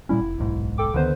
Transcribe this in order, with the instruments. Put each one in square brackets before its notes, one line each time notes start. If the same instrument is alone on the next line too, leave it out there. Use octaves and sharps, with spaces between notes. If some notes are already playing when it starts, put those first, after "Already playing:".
[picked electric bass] A#2 G3 C#4 [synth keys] E4
[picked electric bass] F1
D1 B1 G#2
[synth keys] A4 G5 D6
[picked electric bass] D2 D#3 B3 [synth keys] D3 B4 C5